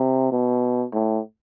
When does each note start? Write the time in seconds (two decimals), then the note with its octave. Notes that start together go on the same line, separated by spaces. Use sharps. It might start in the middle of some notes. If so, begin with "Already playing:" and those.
Already playing: C3
0.32 B2
0.93 A2